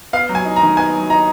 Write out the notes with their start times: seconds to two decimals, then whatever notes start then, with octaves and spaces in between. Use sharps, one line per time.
0.13 B3 F5
0.29 F#3
0.35 G#5
0.45 D#4
0.56 A#5
0.62 D#3
0.77 B3 G#5
0.94 F#3
1.10 D#4 A#5